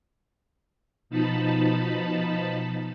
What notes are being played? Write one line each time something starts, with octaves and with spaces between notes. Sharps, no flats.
B2 F3 D#4 A5 B5